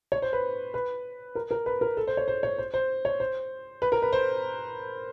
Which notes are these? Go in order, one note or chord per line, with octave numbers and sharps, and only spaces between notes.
C#5
C5
B4
B4
A#4
A#4
B4
A#4
A4
C5
C#5
C5
C#5
C5
C5
C#5
C5
B4
A#4
B4
C5